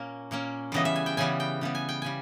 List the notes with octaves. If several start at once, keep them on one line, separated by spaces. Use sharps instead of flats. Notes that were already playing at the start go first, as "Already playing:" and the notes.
Already playing: A#2 A#3 C#4
A#2 A#3 C#4
C#3 E3 G3 B3 D#5
E5
G#5
G5
C#3 E3 G3 B3 G#5
G5
C#3 G3 B3
G#5
G5
C#3 G3 G#5